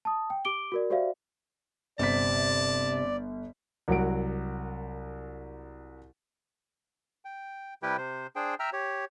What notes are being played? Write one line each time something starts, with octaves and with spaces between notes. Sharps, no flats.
A5 D#6
G5
G4 D6 D7 G7
F#4 A#4 D5
F#4 G4 C5 D5 E5 F5
G1 C3 D5 A5 B6
C2 F#3 A#4 F#5 D7
G5
C3 G3 E4 G4 B4 G5
C3 C5
D4 G#4 C5 G5
E5 G5 A#5 E6 F6
G4 C#5